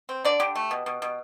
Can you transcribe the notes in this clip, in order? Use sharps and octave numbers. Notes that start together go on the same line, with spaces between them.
C4
D3 D5
D3 G4
A3
B2
B2
B2